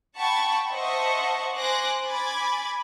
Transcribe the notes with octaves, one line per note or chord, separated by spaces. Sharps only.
F#5 G5 A5 B5 C#6
C5 D#5 E5 F#5 A5 C#6
C5 G#5 C6 D6 F#6 A#6
G#5 B5 D6 G#6 A6